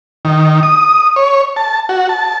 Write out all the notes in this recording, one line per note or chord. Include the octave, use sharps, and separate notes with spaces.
D#3
D#6
C#5
A5
F#4
A5